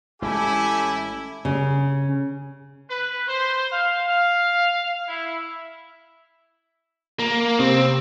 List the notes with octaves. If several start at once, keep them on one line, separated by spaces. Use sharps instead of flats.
A1 G#3 C#4 E4 G4 A4 G#5
C#3
B4
C5
F5
F5
E4
A#3
C3 C4